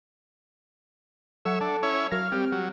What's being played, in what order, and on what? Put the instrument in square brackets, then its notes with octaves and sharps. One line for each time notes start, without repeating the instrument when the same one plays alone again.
[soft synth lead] F#3 [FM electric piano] A4 F#5 C#7 [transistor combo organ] C#5 E5
[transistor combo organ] D4 [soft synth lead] A5
[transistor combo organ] C#4 E4 C#5
[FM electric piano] F#3 A#4 A#6 [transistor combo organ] F5 [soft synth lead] F6
[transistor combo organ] G3 [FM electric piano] C4 G4
[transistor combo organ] F#3 [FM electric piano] G4